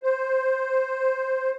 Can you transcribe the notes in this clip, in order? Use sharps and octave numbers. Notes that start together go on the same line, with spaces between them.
C5